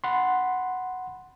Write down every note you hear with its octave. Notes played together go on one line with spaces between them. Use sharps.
F#5 B5 C6